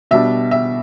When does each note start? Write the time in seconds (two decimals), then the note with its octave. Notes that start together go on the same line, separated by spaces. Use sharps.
0.11 B2 G3 D4 E5
0.51 E5